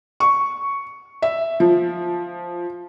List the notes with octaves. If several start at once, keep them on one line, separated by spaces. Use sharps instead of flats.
C#6
E5
F3